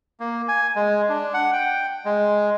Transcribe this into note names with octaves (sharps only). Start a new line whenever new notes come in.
A#3
G#5
G#3
D4
F#5
G5
G#3